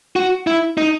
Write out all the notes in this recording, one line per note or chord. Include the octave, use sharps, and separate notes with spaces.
F#4
E4
D#4